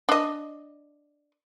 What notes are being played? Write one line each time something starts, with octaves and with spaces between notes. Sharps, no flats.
D4 D#5